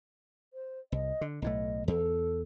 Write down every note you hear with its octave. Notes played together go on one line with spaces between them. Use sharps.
C5
C2 D#5
D3
B1 A2 A3 D#5
E2 A4